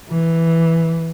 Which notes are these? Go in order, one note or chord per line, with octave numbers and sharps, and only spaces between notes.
E3